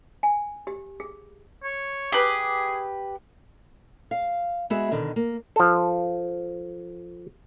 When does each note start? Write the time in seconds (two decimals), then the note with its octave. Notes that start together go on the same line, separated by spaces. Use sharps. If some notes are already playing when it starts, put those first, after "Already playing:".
0.23 G#5
0.67 G4
1.00 G#4
1.64 C#5
2.12 G4 G#4 B4
4.11 F5
4.70 G#3 B3 F#4 G#4 E5
4.91 B2 D3 D#3
5.16 A#3
5.56 F3 A4